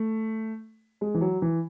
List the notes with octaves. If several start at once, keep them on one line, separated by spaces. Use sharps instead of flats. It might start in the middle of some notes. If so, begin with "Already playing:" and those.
Already playing: A3
G#3
E3
F#3
E3